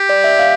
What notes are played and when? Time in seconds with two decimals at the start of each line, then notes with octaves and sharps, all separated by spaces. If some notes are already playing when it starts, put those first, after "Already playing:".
Already playing: G4
0.09 D5
0.24 E5
0.39 F5